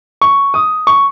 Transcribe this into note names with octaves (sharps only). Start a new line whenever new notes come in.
C#6
D#6
C#6